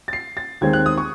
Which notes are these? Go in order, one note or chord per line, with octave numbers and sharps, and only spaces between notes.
A6
C7
A6
D#2 D#3 G#3 C4 G#6
F#6
D#6
C#6